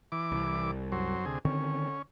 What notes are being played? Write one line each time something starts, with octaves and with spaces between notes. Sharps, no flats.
E3 D6
C2
F#2 F#3 C5
D2 C3 G#4
D3 D#3 C4 C#4